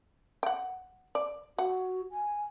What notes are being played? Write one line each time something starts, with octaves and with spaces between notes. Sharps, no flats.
F#5 G5
D5
F#4 F#5
G#5